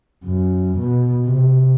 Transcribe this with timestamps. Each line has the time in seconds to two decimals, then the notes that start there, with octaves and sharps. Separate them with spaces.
0.25 F#2
0.78 B2
1.26 C3